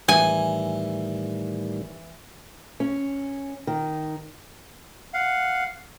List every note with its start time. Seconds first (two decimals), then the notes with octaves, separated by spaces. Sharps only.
0.08 A2 D#3 E3 G3 G#5
2.80 C#4
3.67 D#3
5.14 F5 F#5